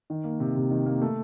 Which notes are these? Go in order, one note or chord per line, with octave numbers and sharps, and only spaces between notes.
D#3
A#3
C3
C3
D#3
A#3
A3